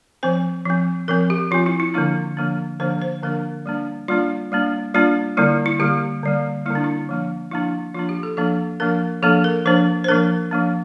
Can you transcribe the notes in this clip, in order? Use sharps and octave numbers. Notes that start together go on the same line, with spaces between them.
F3 C4 C5
F3 C4
F3 C4 A#4
G4
F3 C4 F4
E4
E4
D3 F3 A#3 D4 E4
D3 F3 A#3 D4
D3 F3 A#3 D4 C5
C5
D3 F3 A#3 D4 A#4
G3 A#3 D4
G3 A#3 D4 F4
G3 A#3 D4
G3 A#3 D4 F4
D3 G3 A#3 E4
E4
D3 G3 A#3 G4
D3 G3 A#3
D3 G3 A#3 E4
D4
E4
F3 A#3 D4
F3 A#3 D4 E4
F3 A#3 D4 F4
G4
A4
F3 A#3 D4 A4
F3 A#3 D4 A#4
F3 A#3 D4 A4
A#4
F3 A#3 D4 C5
C5
F3 A#3 D4 A#4
F3 A#3 D4